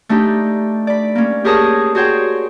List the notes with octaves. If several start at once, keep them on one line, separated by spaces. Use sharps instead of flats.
A3 D4 D#4 G4
D5 B5
A#3 C#4
G4 G#4 A#4 C#5 A5 D#6
F#4 G#4 C5 C#5 G5